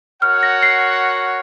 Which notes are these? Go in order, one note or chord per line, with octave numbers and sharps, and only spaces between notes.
F#4 A#4 C#5 F#5 F6
A#6
C7